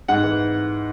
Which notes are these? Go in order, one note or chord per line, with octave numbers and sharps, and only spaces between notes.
G#2 F#5
E3